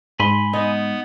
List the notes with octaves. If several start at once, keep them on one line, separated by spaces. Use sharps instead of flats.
G#2 G#5 B5 C6
B3 D#4